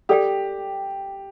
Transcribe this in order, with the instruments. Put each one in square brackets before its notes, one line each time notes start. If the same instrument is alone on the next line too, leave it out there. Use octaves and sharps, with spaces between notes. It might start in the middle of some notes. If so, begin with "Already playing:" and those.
[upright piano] G4 [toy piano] A4 D5 G5